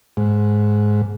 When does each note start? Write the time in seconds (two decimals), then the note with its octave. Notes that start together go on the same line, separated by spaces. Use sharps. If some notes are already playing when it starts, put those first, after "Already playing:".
0.17 G#2